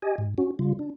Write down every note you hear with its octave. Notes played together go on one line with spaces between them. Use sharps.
G4 D#5 G#5
G#2
C#4 F#4
C#3 G3 F4
D4